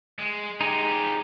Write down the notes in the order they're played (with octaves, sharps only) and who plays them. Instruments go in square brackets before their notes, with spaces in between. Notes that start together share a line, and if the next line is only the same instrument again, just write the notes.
[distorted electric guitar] G#3
[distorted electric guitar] G#3 G4 [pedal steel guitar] D#4 G#4 D#5
[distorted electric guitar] F3 G4